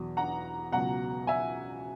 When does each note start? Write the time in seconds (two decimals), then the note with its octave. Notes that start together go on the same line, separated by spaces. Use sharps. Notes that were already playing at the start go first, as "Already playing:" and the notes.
Already playing: E2 B2 F#3 B3
0.17 F#5 A#5
0.72 C#2 B2 F#3 F#5 A#5
1.27 E5 G#5